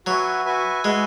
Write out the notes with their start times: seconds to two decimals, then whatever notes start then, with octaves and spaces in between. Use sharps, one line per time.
0.06 F#3 F#4 B4 E5 G#5
0.45 F#4 B4 E5 G#5
0.84 G#3 F#4 B4 E5 G#5